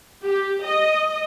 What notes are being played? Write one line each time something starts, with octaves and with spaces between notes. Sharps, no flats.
G4
D#5